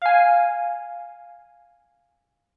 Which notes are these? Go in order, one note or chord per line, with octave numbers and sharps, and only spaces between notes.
F5 G#5